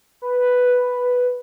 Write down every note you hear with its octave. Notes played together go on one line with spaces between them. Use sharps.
B4